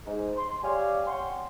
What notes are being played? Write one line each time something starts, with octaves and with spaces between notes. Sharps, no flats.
G#2
C6
G4 C#5 D5 F5 G#5
C#5 F#5 G5 C6